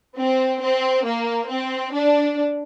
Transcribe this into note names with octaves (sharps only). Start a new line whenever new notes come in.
C4
C4
A#3
C4
D4